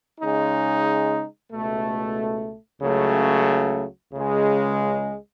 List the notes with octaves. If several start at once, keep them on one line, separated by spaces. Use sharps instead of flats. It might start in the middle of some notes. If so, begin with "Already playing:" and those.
C#3 G#3 D#4
C#2 B2 A3
C#2 C#3 F#3 A3
C#2 C#3 G#3